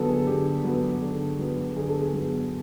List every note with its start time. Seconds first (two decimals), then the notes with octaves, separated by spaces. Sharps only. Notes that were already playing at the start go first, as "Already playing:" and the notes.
Already playing: D3 F#3 B3 A4
0.09 G#4
0.27 D3 G4
0.64 F#3 B3
1.02 D3
1.39 F#3 B3
1.76 D3 G#4
1.88 A4
2.02 G#4
2.13 F#3 B3